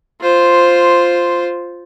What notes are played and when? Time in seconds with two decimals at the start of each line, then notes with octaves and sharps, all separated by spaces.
0.21 F4 C5